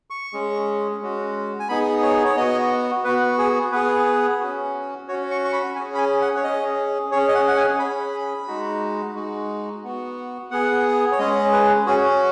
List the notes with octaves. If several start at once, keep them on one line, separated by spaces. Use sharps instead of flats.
C#6
G#3 C#4 G#4
G#3 C#4 F#4
G#5
B3 D#4 G#4 B5
C#5
C#5
B3 F#4 D#5
B3 F#4 B4
G#4
B3 G#4 B4
C#4 F#4
C#4 F#4 C#5
C#6
C#6
B5
C#4 G#4 G#5
B5
G#5
F#5
C#5
C#4 G#4 D#5
C#4 G#4 C#5
D#5
F#5
F#5
G#5
C#4 G#4 B5
G#3 D#4 F#4
G#3 D#4 F#4
B3 F#4
B3 G#4 F#5
C#5
G#3 C#4 G#4 D#5
B4
C#4 F#4 G#4